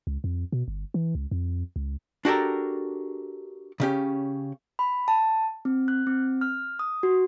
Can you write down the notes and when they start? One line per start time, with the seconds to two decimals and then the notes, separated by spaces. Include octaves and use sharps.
0.07 C#2
0.24 F2
0.52 B2
0.68 G1
0.94 E3
1.15 C#2
1.31 F2
1.76 C#2
2.25 D4 F#4 G4 A4 A#4
3.80 C#3 C#4 G4
4.79 B5
5.08 A5
5.65 C4
5.88 F#6
6.07 C4
6.41 F6
6.79 D#6
7.03 F#4